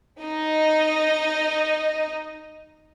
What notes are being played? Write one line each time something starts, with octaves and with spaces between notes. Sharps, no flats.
D#4 D#5